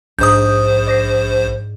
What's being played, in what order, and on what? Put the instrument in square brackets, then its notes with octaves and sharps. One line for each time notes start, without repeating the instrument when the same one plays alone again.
[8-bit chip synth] A#1 C5 [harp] G#2 D4 [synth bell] D#6 G6
[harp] D5 A#6 C7